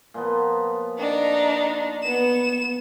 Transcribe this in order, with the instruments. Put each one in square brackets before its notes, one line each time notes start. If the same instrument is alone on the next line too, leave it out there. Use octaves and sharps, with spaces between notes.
[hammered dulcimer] A#2 F3 B3
[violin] D4 D#4
B3 E7